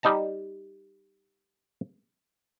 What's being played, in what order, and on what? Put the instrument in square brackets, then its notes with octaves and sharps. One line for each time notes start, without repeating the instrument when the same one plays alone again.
[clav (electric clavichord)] G3 D#4 A5 A#5